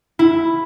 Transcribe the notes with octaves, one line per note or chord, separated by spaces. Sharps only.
E4